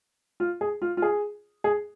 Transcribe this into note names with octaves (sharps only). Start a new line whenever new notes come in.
F4
G#4
F4
F4
G#4
G#4